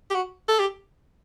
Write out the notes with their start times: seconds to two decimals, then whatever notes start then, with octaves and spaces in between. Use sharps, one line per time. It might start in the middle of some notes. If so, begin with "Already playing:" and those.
0.10 G4
0.15 F#4
0.49 A4
0.59 G4